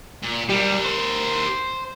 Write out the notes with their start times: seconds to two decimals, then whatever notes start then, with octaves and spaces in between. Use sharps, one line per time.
0.23 A#2
0.50 G3 G4 A#4
0.86 C5